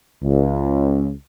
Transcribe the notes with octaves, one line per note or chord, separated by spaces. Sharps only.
C#2